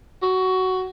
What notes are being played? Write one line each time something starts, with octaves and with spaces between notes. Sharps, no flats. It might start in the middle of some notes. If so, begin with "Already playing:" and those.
F#4